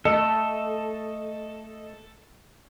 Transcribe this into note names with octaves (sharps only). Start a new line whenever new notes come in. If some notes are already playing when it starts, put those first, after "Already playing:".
A3 A4 D#5